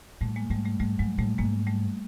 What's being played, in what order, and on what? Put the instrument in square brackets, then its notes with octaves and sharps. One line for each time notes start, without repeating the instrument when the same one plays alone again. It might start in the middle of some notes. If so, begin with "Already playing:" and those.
[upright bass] A2 [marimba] G3 A3
[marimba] G#3 A#3
[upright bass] G#2 [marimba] G3 A3
[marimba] G3 A3
[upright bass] G#2 [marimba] G3 A3
[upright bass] G#2 [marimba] F#3 G#3
[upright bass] A2 [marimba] G3 A3
[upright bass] G#2 [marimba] G#3 A#3
[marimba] G3 A3